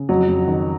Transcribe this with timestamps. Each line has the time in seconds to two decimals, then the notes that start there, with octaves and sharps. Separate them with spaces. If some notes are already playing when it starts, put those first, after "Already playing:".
Already playing: C#3
0.09 F2 F#3
0.28 F2
0.48 D#3